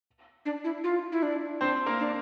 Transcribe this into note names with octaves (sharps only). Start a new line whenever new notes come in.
D4
E4
F4
E4
D4
C4 D4 C5
A#3 A#4
D4